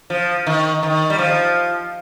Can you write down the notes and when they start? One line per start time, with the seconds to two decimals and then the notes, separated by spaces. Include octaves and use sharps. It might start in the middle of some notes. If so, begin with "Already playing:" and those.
0.10 F3
0.47 D#3
0.83 D#3
1.10 G3
1.19 F3